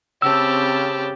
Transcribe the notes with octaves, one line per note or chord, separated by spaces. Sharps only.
C#3 C4 G4 A5 B5 E6